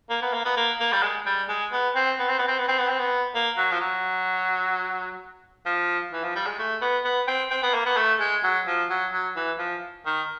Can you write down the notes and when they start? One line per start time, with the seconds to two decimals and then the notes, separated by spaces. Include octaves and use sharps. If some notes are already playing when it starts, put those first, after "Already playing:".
0.10 A#3
0.22 B3
0.33 A#3
0.45 B3
0.56 A#3
0.80 A#3
0.93 G3
1.03 G#3
1.26 G3
1.49 G#3
1.72 B3
1.95 C4
2.19 B3
2.29 C4
2.38 B3
2.48 C4
2.59 B3
2.68 C4
2.78 B3
2.89 C4
2.99 B3
3.35 A#3
3.57 F#3
3.72 F3
3.80 F#3
5.66 F3
6.13 E3
6.24 F3
6.35 G3
6.47 G#3
6.59 A3
6.82 B3
7.05 B3
7.27 C4
7.50 C4
7.63 B3
7.74 A#3
7.86 B3
7.97 A3
8.20 G#3
8.44 F#3
8.67 F3
8.90 F#3
9.13 F#3
9.36 E3
9.59 F3
10.06 D#3